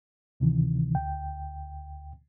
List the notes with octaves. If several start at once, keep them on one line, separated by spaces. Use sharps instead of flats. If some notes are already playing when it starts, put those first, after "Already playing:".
D2 C3 D#3 E3
D2 G5